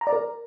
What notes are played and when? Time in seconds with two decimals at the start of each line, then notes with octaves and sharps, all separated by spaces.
0.01 A#5
0.07 D5
0.13 A#4